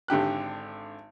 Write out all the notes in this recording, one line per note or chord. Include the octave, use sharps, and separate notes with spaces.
G#1 D3 G4 F#6